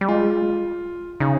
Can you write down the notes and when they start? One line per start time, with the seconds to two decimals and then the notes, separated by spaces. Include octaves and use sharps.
0.01 G3
0.08 G#3 F4
1.20 C#3 D#4